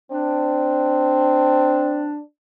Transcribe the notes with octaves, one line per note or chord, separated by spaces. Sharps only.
C4 D4